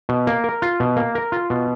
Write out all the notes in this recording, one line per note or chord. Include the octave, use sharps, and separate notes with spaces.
B2
A#3
A#4
F4
B2
A#3
A#4
F4
B2